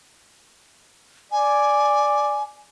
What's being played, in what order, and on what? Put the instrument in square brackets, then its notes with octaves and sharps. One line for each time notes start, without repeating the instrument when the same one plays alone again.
[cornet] D5 [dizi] G#5